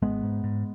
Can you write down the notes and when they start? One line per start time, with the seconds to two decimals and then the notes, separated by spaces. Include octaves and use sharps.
0.02 G#1 G#3 B3
0.23 G#2
0.44 G#2